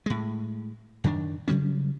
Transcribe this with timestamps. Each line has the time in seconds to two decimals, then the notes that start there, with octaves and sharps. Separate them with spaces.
0.06 A2 G#3
1.04 F#2 D#3 B3 D4
1.48 C#3 F#3 G3 C#4